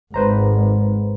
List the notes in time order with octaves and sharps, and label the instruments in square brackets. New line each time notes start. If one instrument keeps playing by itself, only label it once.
[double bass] G#1 G#3 [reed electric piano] B4 C5 A#5